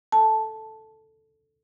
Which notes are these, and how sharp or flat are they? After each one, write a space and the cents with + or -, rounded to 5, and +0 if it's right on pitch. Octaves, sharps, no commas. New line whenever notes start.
A4 +0 A5 -5